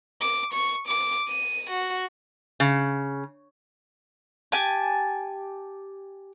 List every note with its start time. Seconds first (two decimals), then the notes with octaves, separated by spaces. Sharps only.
0.21 D6
0.53 C#6
0.88 D6
1.28 D#7
1.70 F#4
2.60 C#3
4.52 G4 G#5 A5